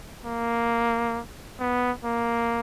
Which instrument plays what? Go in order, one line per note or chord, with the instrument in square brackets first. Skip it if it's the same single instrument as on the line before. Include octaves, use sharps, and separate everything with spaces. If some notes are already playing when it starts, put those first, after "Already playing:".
[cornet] A#3
B3
A#3